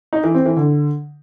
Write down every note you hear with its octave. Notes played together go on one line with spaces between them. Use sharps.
D#4
E3
C4
E3
D3